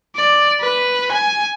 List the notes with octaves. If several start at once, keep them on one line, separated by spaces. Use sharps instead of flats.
D5
B4
G#5